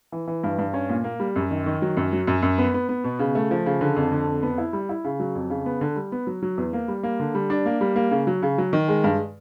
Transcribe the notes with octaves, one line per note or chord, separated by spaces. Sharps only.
E3
E3
G2
G2
C#4
A#2
A#3
G3
F#2
D#3
D#3
F#3
F#2
F#3
F#2
F#2
B3
B3
B3
B2
C#3
A3
F3
C#3
D3
F2
D3
F2
B3
E4
G3
E4
C#3
F#3
F2
C#3
B3
D3
G3
B3
F#3
F#3
E2
A#3
G3
A#3
D3
G3
D4
A#3
G3
A#3
C#3
F#3
C#3
F#3
D#3
G#3
G2